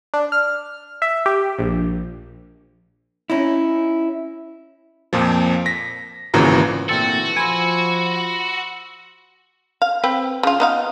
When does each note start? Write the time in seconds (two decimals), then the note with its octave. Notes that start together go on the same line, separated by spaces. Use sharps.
0.14 D4
0.32 F6
1.02 E5
1.26 G4
1.59 A#1
3.30 C#4 D#4 E4
5.13 F2 A#2 F3
5.66 A#6 B6
6.34 G#1 A#2 C#3 E3 F#4 A#5
6.89 A#2 D3 E3 A3 C4 F#4 A4
7.36 F3 G#5 B5 C6 E6
9.82 F5
10.04 C4 B4 G5
10.43 C#3 F4
10.60 B3 D#4 F5